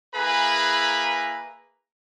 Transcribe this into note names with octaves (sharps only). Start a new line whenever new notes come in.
A#3 E4 G#4 B4 A#5 B5